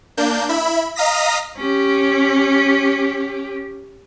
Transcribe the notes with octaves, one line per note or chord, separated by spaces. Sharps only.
A#3 D4 G6
E4 E5 B5
D#5 F5 A#5 D#6 A#6 B6
C#4 G4